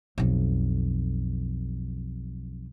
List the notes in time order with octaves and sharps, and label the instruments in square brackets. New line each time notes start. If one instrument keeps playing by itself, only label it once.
[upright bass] B1 F2